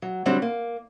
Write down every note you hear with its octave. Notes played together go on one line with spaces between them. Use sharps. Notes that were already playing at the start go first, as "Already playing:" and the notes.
F#3
D3 F#3 G3 C4 D4
A#3